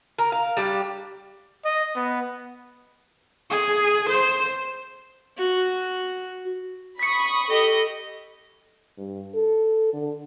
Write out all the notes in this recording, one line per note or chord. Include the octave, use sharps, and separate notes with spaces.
A#4
F5
G3 D4 G4
D#5
B3
G#4
C5
F#4
B5 C#6 D#6 B6 C#7
G4 A4 D#5
G2
A4
D3